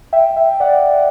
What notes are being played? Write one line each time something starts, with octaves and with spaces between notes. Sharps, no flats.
E5 G5
E5 G5
D5 F#5